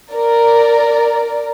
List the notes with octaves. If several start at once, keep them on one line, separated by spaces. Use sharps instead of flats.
A#4 D5